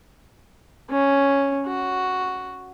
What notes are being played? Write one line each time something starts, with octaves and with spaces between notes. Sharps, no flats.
C#4
F#4